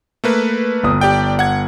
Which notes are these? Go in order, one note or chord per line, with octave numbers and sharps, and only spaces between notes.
A3 A#3 B4
G1 D#6
G4 D5 G5
F#5 G#6